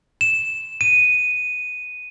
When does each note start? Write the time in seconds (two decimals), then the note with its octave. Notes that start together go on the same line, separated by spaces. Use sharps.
0.21 E7
0.81 D#7